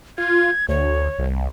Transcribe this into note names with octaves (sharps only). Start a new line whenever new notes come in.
F4 G#6
D2 C#5
C2